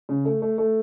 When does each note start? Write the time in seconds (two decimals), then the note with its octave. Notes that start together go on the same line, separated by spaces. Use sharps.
0.09 C#3
0.25 A3
0.42 A3
0.58 A3